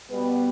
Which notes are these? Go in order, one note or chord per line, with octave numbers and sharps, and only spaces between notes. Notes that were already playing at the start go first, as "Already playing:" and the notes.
B2 G3 B3 B4